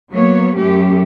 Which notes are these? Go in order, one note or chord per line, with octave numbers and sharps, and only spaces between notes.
F#3 A#3 B3 C#5
F#2 A3 C#4 G4